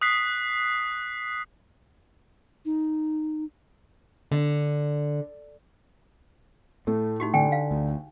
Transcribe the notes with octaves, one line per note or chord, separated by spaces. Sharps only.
D#6 F#6 B6 C7
D#4
D3
A2 A3
D#4 F#4 G4
D3 G5 G#5
F5
D2